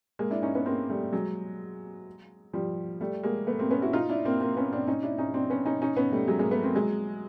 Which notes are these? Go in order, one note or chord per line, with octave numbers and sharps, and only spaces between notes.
G#3 A#3
D4 E4
C#4 D#4
B3 C#4
A#3 C4
G3 A3
F#3 G#3
F3 G3
G3 A3
G#3 A#3
A3 B3
A#3 C4
B3 C#4
E4 F#4
D#4 F4
D4 E4
A#3 C4
A#3 C4
B3 C#4
C4 D4
C#4 D#4
D4 E4
C#4 D#4
C4 D4
B3 C#4
C#4 D#4
C#4 D#4
B3 C#4
G3 A3
F#3 G#3
G#3 A#3
A3 B3
A#3 C4
F#3 G#3